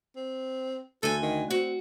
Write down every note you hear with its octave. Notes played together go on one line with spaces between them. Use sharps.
C4
D2 A4 G#5
D#3
C4 F#4